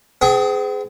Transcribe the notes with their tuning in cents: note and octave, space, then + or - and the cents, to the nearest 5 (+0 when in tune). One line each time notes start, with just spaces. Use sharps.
C4 -45 G#4 +5